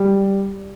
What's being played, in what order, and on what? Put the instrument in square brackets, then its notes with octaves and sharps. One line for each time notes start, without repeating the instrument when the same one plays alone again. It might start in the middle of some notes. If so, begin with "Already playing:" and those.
Already playing: [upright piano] G3